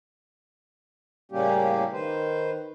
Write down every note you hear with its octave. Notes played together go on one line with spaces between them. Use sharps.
A2 C#3 G3 A#3 C#4 G4
D#3 B4 C5